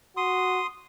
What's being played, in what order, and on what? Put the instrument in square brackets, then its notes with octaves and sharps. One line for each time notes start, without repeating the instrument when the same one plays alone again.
[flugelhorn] F#4 [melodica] C6 D#6